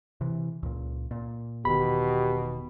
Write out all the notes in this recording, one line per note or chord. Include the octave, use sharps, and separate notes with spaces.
C3 E3
C#2 A#2
A#2
E1 B2 D#3 G4 B5